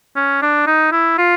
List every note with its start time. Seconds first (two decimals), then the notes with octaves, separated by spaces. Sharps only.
0.16 C#4
0.42 D4
0.67 D#4
0.92 E4
1.18 F4